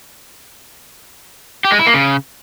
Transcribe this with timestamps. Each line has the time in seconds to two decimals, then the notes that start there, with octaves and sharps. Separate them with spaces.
1.65 G4
1.72 G#3
1.79 E4
1.87 A#3
1.94 C#3